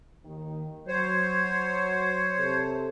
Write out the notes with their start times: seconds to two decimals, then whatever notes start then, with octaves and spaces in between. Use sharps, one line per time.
0.24 D#2 D#3
0.88 F#3 C5 C#5
2.39 C3 A4